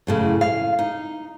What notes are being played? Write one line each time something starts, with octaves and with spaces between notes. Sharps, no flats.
F#2 A2 C#3
F5
D#4